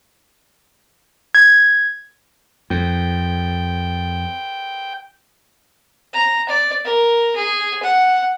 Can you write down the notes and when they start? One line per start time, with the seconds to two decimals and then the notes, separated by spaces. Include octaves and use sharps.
1.35 G#6
2.70 F2 G5
6.14 A#5
6.48 D5
6.85 A#4
7.36 G#4
7.83 F#5